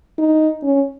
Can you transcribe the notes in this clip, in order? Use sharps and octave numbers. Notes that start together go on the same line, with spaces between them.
D#4
C#4